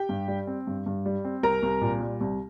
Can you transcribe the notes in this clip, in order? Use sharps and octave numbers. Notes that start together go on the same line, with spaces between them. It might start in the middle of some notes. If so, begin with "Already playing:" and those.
Already playing: G4 G5
G2
G3
C4
G2
G2
G3
C4
C2 A#4 A#5
C2
A#2
G3
C2